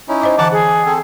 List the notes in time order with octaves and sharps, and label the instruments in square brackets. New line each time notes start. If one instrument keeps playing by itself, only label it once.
[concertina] C#4 D#4 E4
[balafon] C5 D#5 D6
[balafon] D3 E3 A#5 [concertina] F#5 A5 D6
[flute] G#4 [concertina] F#5
[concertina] C4 A4